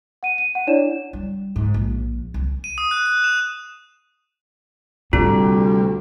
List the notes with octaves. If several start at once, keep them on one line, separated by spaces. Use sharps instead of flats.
F#5 D#7
D#7
F#5
D4 E4 C#5 D5 E7
G3
G#2
A#1
C2
D#7
D#6
F#6
F#6
E7
D2 C3 G3 F4